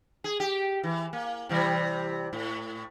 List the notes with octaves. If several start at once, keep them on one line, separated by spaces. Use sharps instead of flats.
G#4
G4
E3
A#3
C3 E3 G3
A2